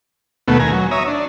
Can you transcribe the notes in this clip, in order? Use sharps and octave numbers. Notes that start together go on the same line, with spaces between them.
D#2 B2 A3 B3
D#2 G#5 A#5
F#3
C#5 E5 A#5 D#6
D4